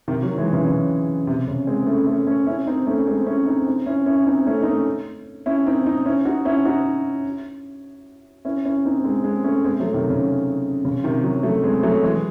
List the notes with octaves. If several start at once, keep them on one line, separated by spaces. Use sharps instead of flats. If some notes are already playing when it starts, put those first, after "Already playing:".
C3 D#3
D#3 F#3
E3 G#3
C#3 E3
C#3
C3
C#3
G#3 C4
A3 C#4
A3 C#4
A3 C#4
C#4 E4
C4 D#4
A3 C#4
G#3 C4
C#4 E4
C4 D#4
C4 D#4
C#4 E4
C#4 E4
E4
C4 D#4
A3 C#4
D#4
A3 C#4
C#4 E4
C4 D#4
C4 D#4
C#4 E4
D#4 F#4
C#4 E4
D#4 F#4
C#4 E4
C#4 E4
C4 D#4
G#3 C4
G#3 C4
A3 C#4
G#3 C4
F#3 A3
C3 D#3
C#3
C#3
C3 D#3
D#3 F#3
F#3 A3
G#3 C4
F#3 A3
E3 G#3